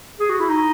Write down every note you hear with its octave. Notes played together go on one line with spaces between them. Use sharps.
G#4
F#4
E4
D#4